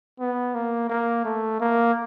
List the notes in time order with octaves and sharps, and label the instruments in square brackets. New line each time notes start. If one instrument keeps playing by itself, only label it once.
[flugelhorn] B3
A#3
A#3
A3
A#3